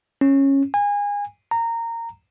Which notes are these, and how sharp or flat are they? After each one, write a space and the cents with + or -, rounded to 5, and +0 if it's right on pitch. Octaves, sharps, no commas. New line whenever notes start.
C#4 -15
G#5 -25
A#5 -15